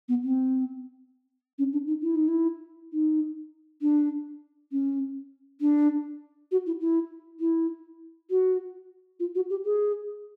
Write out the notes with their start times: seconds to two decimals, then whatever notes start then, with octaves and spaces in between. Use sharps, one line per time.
0.09 B3
0.24 C4
1.59 C#4
1.73 D4
1.87 D#4
2.02 E4
2.16 D#4
2.28 E4
2.93 D#4
3.82 D4
4.72 C#4
5.61 D4
6.52 F#4
6.66 E4
6.81 E4
7.40 E4
8.30 F#4
9.20 F4
9.35 F#4
9.50 G4
9.65 G#4